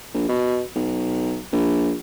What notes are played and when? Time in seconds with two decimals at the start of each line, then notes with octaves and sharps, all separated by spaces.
0.14 A#1
0.29 B2
0.75 B1
1.53 A#1